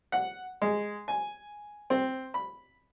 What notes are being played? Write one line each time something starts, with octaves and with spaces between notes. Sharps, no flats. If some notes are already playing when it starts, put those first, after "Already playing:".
F#5
G#3
G#5
C4
B5